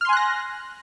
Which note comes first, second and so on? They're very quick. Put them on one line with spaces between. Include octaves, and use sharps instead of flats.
F6 C6 G#5 F#6 A#6